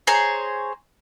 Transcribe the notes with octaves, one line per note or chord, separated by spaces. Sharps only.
G#4 C5 C#5 A#5